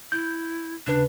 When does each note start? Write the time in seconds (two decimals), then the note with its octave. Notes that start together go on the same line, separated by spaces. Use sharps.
0.12 E4 G6
0.87 D#2 C#3 D4 B4